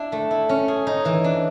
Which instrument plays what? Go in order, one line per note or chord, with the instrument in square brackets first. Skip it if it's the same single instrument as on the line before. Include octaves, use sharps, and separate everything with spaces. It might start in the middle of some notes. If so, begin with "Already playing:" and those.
Already playing: [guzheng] D4 E4
A3
E4
C#4
G#4
D#4
E3
D4